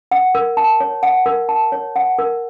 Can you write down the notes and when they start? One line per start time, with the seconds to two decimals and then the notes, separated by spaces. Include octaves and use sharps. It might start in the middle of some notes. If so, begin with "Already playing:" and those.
0.11 F#5
0.35 A#4
0.57 A5
0.80 C#5
1.03 F#5
1.26 A#4
1.49 A5
1.72 C#5
1.96 F#5
2.19 A#4